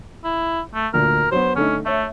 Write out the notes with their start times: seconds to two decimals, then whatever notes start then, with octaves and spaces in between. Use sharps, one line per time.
0.24 E4
0.74 A3
0.94 D2 A#2 A#4
1.32 F#3 B3 C5
1.56 D3 A3 C#4 D#4
1.86 A3 C#5 E5